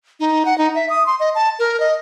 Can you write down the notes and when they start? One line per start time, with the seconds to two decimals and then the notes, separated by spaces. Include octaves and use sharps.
0.20 D#4
0.45 F#5
0.58 D#4
0.75 E5
0.89 D#6
1.06 C6
1.20 D#5
1.35 A5
1.59 A#4
1.80 D#5